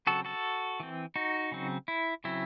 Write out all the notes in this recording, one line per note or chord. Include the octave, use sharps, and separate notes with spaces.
C#3 F#3 C4 F#4 A4
F#4 A4
E3 C4
D#4 F#4
C#3 F#3 C4
E4
C#3 F#3 C4 E4